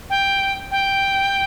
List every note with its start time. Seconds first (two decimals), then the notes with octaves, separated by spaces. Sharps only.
0.10 G5
0.71 G5